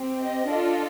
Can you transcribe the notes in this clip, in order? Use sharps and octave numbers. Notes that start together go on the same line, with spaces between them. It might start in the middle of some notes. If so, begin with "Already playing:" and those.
Already playing: C4 G4
D#5
D4 F4 A4